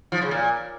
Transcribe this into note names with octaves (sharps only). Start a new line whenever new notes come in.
F3
C#3
A#2